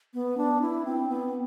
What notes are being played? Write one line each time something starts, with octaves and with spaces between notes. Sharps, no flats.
B3
D4
E4
C4
B3